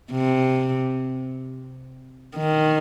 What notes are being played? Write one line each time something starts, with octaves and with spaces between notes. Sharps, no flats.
C3
D#3